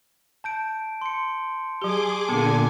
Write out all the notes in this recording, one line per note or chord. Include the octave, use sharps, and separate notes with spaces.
A5 G6 D7
C6 C#7
F#3 G4 G#4 D6 G7
A#2 D3 B3 A4 G#5 A5 D6 C#7